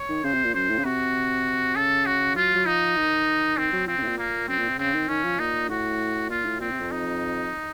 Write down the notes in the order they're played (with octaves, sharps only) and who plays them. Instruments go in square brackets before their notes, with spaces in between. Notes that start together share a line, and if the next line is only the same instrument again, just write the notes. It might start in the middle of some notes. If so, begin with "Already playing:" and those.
Already playing: [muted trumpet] C#5
[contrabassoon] D#3
[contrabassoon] C#3 [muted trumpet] C5
[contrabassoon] C3
A#2
[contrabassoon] F#2 [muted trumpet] C5
[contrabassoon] A2
C#3
[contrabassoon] C3 [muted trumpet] F#4
[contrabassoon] C#3 [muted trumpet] A4
[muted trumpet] F#4
[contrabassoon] F#3 [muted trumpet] F4
[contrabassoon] F#3
[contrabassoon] F3 [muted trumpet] D#4
[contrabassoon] D#3
[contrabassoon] D#3 [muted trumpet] C4
[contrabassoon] F#3
[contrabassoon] F3 [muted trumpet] C4
[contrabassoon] C#3
A2
A#2
[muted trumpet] A#3
[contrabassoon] F#2 [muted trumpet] C4
[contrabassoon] A#2
C3
[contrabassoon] C#3 [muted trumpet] C4
[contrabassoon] D#3
[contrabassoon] D#3 [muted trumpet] C#4
[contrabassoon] F3
[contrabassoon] A#2 [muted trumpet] D#4
[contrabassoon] A2 [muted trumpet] F#4
[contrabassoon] A#2 [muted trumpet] F4
[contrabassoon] A2
[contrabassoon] A#2 [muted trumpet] C4
[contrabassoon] C3
F2
[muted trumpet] D#4